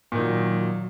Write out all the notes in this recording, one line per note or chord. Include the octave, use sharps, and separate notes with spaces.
A#2 D#3 F#3